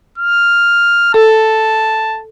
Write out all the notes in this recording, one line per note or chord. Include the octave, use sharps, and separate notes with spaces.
F6
A4 A5